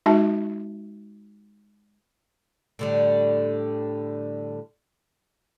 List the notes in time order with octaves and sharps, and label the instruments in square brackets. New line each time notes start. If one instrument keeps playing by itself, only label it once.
[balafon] G#3 D#4 F#4 E5 A5
[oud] A2 D3 G3